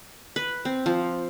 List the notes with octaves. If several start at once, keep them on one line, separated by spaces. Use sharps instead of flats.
B4
C4
F3